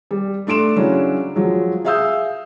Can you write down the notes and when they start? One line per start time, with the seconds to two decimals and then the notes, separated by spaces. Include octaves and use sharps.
0.11 G3
0.47 A3 D4 C6 D7 E7
0.76 C#3 F#3 C#4 D4 E4
1.35 F3 F#3 G#3
1.85 G#4 E5 F5 D#6 E6 G6